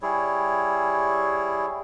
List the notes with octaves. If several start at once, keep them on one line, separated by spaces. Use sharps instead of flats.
G3 E4 G#4 C#5